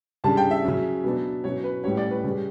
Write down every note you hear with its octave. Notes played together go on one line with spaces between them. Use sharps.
C#3 G3 D4 A5
G5
E5
C#3 F#3 C#4
B2 F#3 B3 D4
B2 F#3 C#4 C#5
B4
A2 G3 C#4 C#5
D5
B4
C#3 G3 C#4